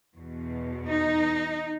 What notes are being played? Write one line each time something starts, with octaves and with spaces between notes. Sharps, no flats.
E2 B2
D#4